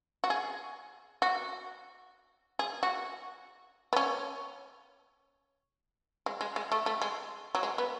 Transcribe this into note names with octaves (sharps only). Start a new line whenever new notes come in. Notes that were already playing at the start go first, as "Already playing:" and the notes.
F#4
G#4
F#4
G#4
F#4
B3
C#4
G#3
G#3
G#3
A3
A3
G#3
F#3
G#3
B3